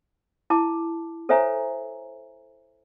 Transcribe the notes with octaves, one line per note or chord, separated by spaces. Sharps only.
E4 A5 D6
A4 C5 C#5 E5 G#5 A#5